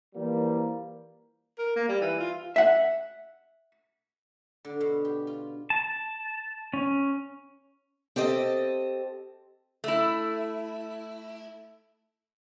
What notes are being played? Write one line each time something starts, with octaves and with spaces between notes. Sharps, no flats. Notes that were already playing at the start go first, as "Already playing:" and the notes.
E3 F3 G3 A#3
A#4
A#3
G3
E3
F4
E5 F#5
D3
B2
G4
F4
A5
C#4
C4 G4 A4 D#5
A3 E4